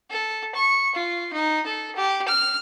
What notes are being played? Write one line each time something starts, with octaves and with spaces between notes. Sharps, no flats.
A4
C#6
F4
D#4
A4
G4
F6